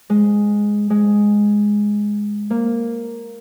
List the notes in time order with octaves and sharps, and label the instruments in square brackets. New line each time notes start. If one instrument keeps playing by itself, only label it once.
[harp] G#3
G#3
A#3